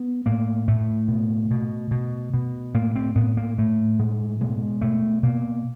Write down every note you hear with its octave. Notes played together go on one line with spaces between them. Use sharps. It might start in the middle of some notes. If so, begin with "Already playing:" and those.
Already playing: B3
A2 A#3
A2 A3
B2
B2
B2
B2
A2 A#3
C4
A2 B3
A#3
A2 A3
A2 G#3
B2 G#3
B2 A3
B2 A#3